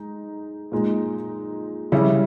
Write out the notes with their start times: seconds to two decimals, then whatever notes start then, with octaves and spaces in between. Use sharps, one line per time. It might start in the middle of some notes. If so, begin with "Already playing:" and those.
Already playing: G#3 D#4
0.72 A#2 G#3 D#4
1.92 C#3 G3 C#4 E4